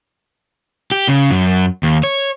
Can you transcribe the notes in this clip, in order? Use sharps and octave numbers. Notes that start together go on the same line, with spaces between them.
G4
C#3
F#2
D#2
C#5